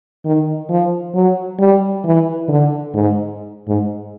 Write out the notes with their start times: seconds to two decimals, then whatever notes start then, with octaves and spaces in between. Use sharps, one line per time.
0.25 D#3
0.70 F3
1.15 F#3
1.59 G3
2.05 E3
2.49 D3
2.94 G#2
3.68 G#2